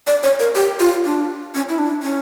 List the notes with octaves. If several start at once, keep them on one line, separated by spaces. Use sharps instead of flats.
D5
C#5
A#4
G4
F4
D4
C#4
E4
D4
C#4